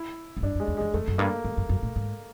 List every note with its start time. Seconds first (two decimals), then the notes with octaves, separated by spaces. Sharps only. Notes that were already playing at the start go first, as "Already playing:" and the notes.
Already playing: E4
0.37 G#2
0.43 G2 D4
0.55 F#2
0.60 G#3
0.68 E2
0.77 F2 G#3
0.94 F2 A3
1.08 F#2
1.18 G2 A#3
1.45 G#2
1.57 G2
1.69 F#2
1.83 A2
1.96 G#2